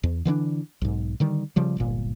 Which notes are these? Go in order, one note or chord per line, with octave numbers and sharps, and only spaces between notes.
E2
D3 E3 A3 D4
B1 G#2
D3 D#3 G3
C#3 F3 G3
D1 G1 A#2